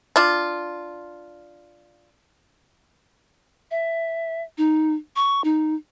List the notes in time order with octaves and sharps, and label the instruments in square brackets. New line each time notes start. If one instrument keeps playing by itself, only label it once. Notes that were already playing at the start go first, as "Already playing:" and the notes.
[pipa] D4 F4
[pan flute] E5
D#4
C#6
D#4